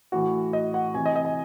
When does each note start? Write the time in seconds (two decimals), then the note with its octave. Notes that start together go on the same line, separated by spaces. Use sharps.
0.12 A2 E3 F#4
0.53 D#5
0.74 F#5
0.94 C3 E3 G#5
1.06 D#5
1.16 D#5
1.25 G#5